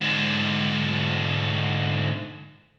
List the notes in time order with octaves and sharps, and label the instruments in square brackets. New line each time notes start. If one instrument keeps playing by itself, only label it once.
[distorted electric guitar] G#2 D3